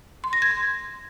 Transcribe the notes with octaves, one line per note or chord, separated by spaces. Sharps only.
C6
A#6
G#6
C6